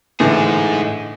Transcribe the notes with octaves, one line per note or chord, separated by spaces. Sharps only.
A2 D3 E3 D#4 G#4